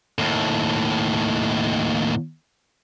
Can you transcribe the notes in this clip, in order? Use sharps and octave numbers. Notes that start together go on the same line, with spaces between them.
D#2 A2